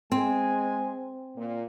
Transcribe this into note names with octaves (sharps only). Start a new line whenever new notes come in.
G#3 C4 G#5
A#2